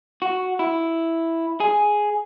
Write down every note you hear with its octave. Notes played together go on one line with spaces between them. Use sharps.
F#4
E4
G#4